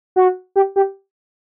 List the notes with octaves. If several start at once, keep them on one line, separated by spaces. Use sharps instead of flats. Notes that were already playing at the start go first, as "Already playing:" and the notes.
F#4
G4
G4